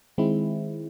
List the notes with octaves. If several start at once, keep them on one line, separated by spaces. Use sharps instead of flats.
D#3 G#3 C4 E4